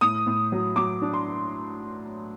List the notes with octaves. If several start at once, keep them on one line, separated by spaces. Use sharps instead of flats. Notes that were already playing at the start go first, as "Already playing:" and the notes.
A2 D#6
A2
F#3
F#3 D6
D4
C6